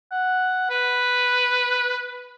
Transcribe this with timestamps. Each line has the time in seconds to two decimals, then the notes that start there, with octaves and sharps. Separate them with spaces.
0.12 F#5
0.70 B4